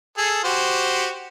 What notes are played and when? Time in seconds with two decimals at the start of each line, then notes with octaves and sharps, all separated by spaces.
0.18 G#4 A4
0.44 F#4 G4 C5